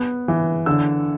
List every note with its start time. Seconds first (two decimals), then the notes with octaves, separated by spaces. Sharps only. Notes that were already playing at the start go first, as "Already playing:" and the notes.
Already playing: B3
0.28 E3
0.66 D3 E6